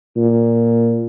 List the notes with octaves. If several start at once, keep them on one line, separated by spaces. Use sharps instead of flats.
A#2